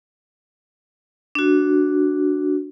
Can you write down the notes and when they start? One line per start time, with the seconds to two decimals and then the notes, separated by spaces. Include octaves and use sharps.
1.35 D4 F#4